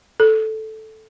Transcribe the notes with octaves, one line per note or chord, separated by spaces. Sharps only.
A4